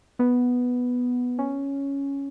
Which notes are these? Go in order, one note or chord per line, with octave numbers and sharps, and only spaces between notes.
B3
C#4